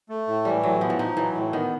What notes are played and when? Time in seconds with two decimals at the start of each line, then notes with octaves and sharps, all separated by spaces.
0.09 A3
0.27 A2
0.45 E3 G3
0.63 A2 F#3
0.81 F3 B3
0.90 E3
0.99 F3 D#4
1.17 E3 F#3
1.35 A2
1.53 D#3 B3